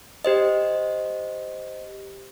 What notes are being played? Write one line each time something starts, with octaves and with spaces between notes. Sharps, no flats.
G4 C5 D#5